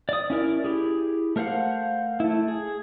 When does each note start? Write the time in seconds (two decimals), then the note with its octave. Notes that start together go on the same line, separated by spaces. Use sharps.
0.09 D5 D#6
0.30 C#4 E4 A#4 D5
0.64 E4 G4 G#4
1.36 A3 A#4 C5 F5 F#5
2.20 A3 E4
2.48 G#4